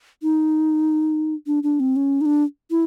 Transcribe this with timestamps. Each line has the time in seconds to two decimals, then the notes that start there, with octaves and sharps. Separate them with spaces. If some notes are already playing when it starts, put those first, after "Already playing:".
0.23 D#4
1.47 D4
1.63 D4
1.80 C4
1.96 C#4
2.21 D#4
2.26 D4
2.71 E4